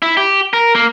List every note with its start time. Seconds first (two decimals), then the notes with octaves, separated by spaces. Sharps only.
0.02 E4
0.17 G4
0.53 A#4
0.75 A#3